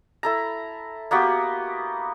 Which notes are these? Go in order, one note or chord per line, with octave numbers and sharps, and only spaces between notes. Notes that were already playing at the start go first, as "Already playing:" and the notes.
E4 A4 A#5
A#3 B3 F#4 G4